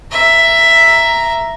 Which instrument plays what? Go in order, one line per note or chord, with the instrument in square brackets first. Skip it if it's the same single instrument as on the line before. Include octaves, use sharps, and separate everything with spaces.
[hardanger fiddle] E5 A#5